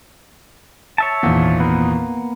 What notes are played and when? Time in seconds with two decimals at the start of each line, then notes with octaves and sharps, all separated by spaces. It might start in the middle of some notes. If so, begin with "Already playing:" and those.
0.98 C#5 E5 A5
1.23 G#1 E2 A#2
1.60 A#3 B3